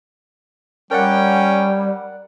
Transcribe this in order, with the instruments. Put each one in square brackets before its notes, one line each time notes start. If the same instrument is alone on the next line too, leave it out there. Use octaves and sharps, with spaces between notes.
[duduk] G3 [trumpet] C#4 [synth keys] A#4 D5 F#5 [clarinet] G5